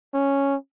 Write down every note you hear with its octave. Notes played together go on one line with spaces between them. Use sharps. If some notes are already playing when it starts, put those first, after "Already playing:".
C#4